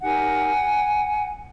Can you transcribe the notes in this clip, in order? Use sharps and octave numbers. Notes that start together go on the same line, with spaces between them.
D#4 G4 A#4 F#5 G#5